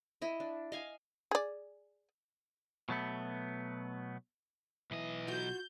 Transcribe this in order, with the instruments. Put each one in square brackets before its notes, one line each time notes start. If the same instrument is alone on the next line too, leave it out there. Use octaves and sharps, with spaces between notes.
[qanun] E4 D#5
D4
D#5 F5 G#5
[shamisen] G#4 D5
[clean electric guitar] B2 F#3 A3 B3
[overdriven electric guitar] B1 D#5 [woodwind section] E3
[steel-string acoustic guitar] F4 F#4 [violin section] G6